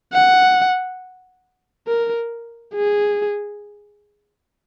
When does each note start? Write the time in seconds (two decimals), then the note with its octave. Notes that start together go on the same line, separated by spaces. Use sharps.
0.13 F#5
1.87 A#4
2.74 G#4